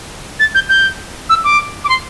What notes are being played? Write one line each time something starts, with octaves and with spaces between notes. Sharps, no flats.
A6
G6
G6
E6
D6
D6
C6